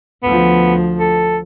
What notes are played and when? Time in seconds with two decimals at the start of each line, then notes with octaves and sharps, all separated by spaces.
0.23 D2 F3 B3
1.00 A4